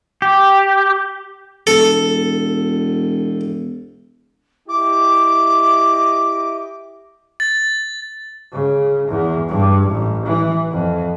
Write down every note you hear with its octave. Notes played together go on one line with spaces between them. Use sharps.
G4
E1 A4
E4 G4 D#5 D6
A6
C#3
E2
G2
A1
E3
F2